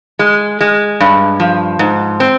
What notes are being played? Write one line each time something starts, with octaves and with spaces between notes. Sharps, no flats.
G#3
G#3
G2
F3
G#2
C4